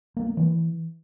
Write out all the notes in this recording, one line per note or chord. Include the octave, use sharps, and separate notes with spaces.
A#3
A#3
E3